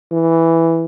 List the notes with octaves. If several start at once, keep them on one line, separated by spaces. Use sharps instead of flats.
E3